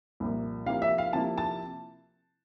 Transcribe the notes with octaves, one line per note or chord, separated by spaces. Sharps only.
C2 A#2 F3 A#3
C3 F3 A#3 E4 F5
E5
F5
C3 F3 A#3 E4 A5
A5